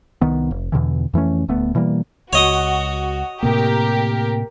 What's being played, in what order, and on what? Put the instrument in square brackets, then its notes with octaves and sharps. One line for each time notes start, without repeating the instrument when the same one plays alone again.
[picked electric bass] C2 D#3 B3
F1
E2 B2 D3 E3
F2 E3 A3 C#4
D1 D2 A3 B3
B2 E3 G3 A#3
[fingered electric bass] C#2 [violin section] F#4 [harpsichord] C#5 D#5 D#6
[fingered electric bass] A2 C3 A#3 [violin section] G4 A#4